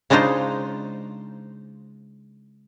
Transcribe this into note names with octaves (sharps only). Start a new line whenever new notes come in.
C#3 G#3 D4 D#4 F4 C5